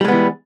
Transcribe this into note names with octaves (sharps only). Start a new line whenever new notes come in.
E3 G3 G#3 B3